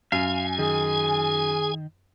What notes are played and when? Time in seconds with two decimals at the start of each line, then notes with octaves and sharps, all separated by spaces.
0.12 F#2 F5 G#5
0.59 D#3 G#4